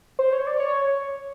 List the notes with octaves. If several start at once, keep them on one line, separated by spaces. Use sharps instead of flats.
C5
C#5
D5
C#5